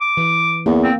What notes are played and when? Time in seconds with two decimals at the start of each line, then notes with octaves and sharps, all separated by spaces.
0.01 D6
0.17 E3
0.66 E2 A#3
0.83 C4